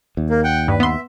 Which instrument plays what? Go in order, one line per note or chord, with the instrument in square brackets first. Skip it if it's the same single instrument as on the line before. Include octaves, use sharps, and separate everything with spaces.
[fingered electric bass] D#2
[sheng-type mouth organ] A#3
F#5 G5
[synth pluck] G2 [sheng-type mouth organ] B4
[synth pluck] B3 C6 [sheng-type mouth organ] E5